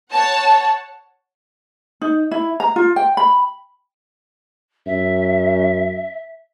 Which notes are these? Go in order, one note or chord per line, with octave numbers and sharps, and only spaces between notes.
C#5 F#5 A5
D#4
E4
A#5
F4
G5
B5
F#2 E5